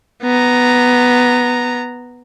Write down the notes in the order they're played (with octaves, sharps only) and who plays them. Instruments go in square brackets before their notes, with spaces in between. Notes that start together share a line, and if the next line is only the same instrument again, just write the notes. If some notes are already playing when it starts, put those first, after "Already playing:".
[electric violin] B3 A#5